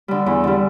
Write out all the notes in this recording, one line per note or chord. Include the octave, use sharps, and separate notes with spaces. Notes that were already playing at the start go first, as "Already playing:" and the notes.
D3 G3
E2
D3 G3